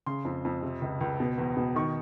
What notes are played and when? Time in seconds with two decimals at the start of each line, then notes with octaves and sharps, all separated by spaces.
0.06 C#3 C6
0.25 F2
0.45 F2
0.63 C3
0.82 C#2
1.01 C#2
1.20 B2
1.38 E2
1.57 B2
1.75 D#3 C#6